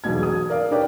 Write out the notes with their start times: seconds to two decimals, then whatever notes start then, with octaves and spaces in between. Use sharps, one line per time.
0.04 E1 B1 B2 G#6
0.23 D#6
0.50 A#4 D5 F5
0.71 D4 G4 A#4 B4 C#5 D5